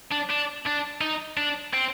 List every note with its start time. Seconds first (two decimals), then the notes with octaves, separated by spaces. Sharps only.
0.11 D4
0.29 D4
0.66 D4
1.01 D#4
1.37 D4
1.73 C4